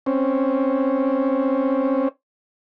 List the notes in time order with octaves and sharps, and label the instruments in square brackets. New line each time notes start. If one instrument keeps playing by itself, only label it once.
[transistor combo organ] C4 C#4